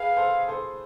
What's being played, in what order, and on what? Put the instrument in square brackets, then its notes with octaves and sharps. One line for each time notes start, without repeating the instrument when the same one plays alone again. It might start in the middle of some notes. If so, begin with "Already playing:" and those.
Already playing: [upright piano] G#4 B4 [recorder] F5
[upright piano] A4 C5
A4 C5